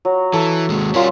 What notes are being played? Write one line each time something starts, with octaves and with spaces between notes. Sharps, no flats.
F#3
E3 A4
D#2 G#3
G3 C#4 F4 A#4 C5